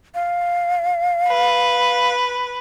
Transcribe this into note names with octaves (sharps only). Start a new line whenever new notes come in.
F5
B4